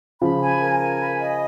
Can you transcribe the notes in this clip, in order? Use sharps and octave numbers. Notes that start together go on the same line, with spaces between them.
C#3 F3 B5
G#5
A#4
G#5
B5
D#5